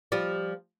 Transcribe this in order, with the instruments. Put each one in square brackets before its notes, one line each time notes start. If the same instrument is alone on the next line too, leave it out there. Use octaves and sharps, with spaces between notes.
[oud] F3 G3